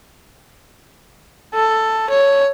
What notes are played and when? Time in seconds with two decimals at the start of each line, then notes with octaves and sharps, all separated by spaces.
1.54 A4
2.09 C#5